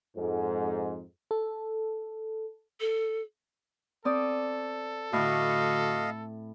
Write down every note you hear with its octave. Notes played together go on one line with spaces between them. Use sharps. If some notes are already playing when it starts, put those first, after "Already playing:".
F2 G#2
A4
A4
C4 A4 D5 D#6
A2 D3 A3 F#4 D#5 F5